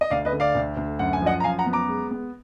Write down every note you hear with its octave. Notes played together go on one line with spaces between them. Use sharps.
D#5
D2 D5 F5
B4 D#5
D3
D5 F5
D2
D2
F#2 F#5
G#5
F3 D#5 F#5
A#5
F#2 F5 G#5
F#5 A#5
B3
A#5 D6
G#3
B3